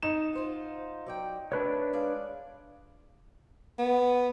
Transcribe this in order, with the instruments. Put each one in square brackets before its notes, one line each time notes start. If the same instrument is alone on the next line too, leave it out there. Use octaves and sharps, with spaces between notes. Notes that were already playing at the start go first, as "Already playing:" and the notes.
[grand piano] D#4 E7
[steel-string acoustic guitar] F4 C5 F#5
F#3 D5 G5
[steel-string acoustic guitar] A3 [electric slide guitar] D4 B4 C#5
[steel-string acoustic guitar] G#3 D5 F5
[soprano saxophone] B3